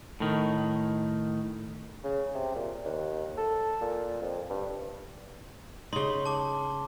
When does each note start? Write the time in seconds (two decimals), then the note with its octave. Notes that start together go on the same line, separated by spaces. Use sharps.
0.20 A2 D#3
2.04 C#3
2.35 C3
2.56 A#2
2.85 D#2
3.38 A4
3.81 A#2
4.22 F2
4.50 G2
5.93 C#3 D#4 C6 G7
6.26 A5 D6